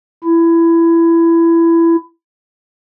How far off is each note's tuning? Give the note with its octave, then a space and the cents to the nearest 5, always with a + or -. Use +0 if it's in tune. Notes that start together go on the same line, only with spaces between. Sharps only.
E4 +20